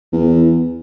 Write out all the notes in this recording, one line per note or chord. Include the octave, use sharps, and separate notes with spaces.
E2